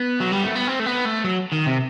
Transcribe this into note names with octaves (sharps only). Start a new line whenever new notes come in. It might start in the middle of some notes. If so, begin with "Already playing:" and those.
Already playing: B3
F#3
G3
A3
B3
C4
A3
B3
A3
F#3
D#3
C3